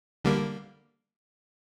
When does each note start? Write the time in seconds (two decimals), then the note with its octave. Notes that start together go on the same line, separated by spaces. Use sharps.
0.24 D3 G3 A#3